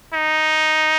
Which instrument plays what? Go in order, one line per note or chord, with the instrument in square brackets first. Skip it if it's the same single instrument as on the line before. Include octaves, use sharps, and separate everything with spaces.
[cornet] D#4